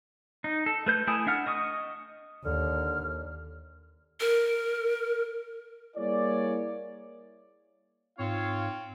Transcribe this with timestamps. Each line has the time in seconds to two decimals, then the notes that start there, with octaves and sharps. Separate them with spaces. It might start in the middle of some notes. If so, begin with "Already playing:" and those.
0.44 D#4
0.66 A4
0.86 A3 B4 G6
1.07 A3 E4 G#5 D#6
1.26 D4 E5 F#5 F6
1.46 D#5 C#6 D#6
2.45 D#2 D3 F6
4.20 A#4
5.97 G3 A#3 E4 G#4 C#5 D5
8.19 G#2 C4 F4 C#5 F5